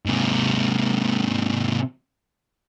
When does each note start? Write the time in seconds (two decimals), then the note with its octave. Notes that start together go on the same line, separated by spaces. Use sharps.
0.06 G#2 C3